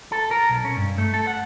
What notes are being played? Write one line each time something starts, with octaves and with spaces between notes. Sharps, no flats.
A4
A#4
B1
C#4
G2
A3
A4
F#5